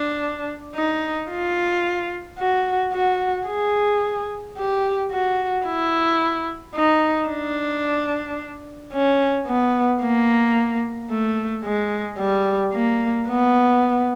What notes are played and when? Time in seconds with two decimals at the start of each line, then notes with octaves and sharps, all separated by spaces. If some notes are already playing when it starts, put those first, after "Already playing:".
Already playing: D4
0.75 D#4
1.31 F4
2.39 F#4
2.93 F#4
3.48 G#4
4.57 G4
5.12 F#4
5.66 E4
6.75 D#4
7.29 D4
8.93 C#4
9.47 B3
10.02 A#3
11.11 A3
11.64 G#3
12.19 G3
12.73 A#3
13.28 B3